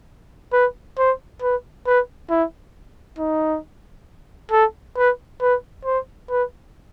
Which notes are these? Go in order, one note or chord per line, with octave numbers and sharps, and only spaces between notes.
B4
C5
B4
B4
E4
D#4
A4
B4
B4
C5
B4